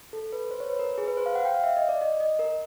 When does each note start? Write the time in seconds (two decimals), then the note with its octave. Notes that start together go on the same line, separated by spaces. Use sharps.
0.13 A4
0.33 B4
0.51 C5
0.60 C#5
0.70 B4
0.79 A#4
0.98 G#4
1.08 B4
1.17 C5
1.26 F5
1.35 F#5
1.45 G5
1.54 F5
1.64 E5
1.77 D#5
1.89 D5
2.01 D#5
2.20 D#5
2.39 A#4